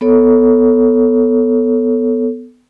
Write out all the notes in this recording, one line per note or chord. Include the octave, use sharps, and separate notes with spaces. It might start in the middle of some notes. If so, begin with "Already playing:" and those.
B3 A4 C#5